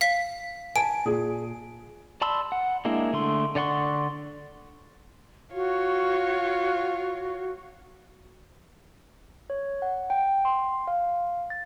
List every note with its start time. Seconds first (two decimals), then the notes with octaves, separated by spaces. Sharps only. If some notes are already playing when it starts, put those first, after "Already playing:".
0.01 F5 B6
0.76 G#5 A5 D7
1.05 A#2 G#4
2.21 D5 A5 B5 C6 E6
2.52 F#5
2.85 G#3 A#3 D4 E4
3.13 D3 A3 C6
3.55 D3 D5 F#5 C6 C#6
5.53 F4 F#4 C#5
9.50 C#5
9.82 F#5
10.10 G5
10.45 C6
10.88 F5
11.50 A6